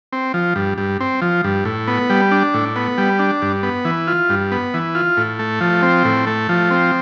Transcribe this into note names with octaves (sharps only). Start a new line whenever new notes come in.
C4
F3
G2
G2
C4
F3
G2
A2
B3
G3
D4
A2
B3
G3
D4
G2
B3
E3
F4
G2
B3
E3
F4
A2
A3
F3
C4
A2
A3
F3
C4